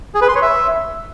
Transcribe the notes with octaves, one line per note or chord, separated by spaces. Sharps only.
G#4
B4
C6
C#5
E5